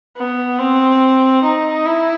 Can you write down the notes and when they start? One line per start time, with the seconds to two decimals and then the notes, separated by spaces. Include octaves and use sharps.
0.17 B3
0.58 C4
1.43 D#4
1.85 E4